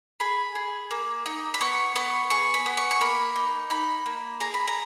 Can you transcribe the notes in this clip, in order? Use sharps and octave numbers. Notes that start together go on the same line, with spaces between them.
G#4 B5
G#4
A#3
D#4
B5
B3 C#6
B3 C#6
G#4 C#6
B5
B3
C#6
C#6
A#3 B5
D#4
D#4 B5
A#3
G#4 A#5
B5
A#5